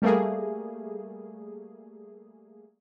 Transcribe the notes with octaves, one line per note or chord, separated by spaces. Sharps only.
G3 A3 A#3 G#4